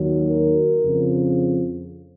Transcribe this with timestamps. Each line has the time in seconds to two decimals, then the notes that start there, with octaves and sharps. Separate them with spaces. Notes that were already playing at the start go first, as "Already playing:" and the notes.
Already playing: D#2 D#3 F#3
0.28 A#4
0.83 F2 C#3 F3